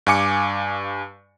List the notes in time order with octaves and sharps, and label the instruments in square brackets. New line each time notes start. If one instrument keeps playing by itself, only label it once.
[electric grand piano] G2 F5 G#5 D6 C#7